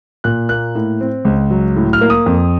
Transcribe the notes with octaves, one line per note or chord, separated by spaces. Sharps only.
A#2 F#6
A#3 F#6
A2
C4
C#2
F#3
A2
F6
A#3
D#6
F2